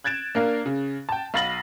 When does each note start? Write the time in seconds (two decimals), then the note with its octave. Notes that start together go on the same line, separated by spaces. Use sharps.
0.04 F#6 G#6 A6 D7 E7
0.35 A#3 D4 A#4 F5
0.66 C#3
1.09 G5 A5
1.34 B1 F5 B5 A6 A#6 F#7